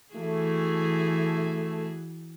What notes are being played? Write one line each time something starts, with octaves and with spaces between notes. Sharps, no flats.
E3 A3 F#4 G#4